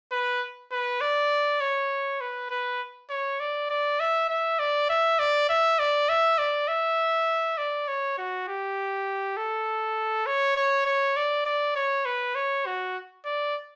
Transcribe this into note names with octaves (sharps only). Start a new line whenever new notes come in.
B4
B4
D5
C#5
B4
B4
C#5
D5
D5
E5
E5
D5
E5
D5
E5
D5
E5
D5
E5
D5
C#5
F#4
G4
A4
C#5
C#5
C#5
D5
D5
C#5
B4
C#5
F#4
D5